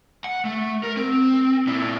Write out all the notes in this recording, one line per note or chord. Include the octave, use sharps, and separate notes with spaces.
F#5
A3
A#4
C4
A#2 E4